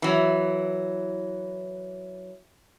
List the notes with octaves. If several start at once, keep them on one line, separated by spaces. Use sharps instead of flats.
E3 F#3